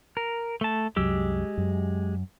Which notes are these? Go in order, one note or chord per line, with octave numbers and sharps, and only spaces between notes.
A#4
A3 A5
C2 F#2 F#3 G#3 G4 E6
F#2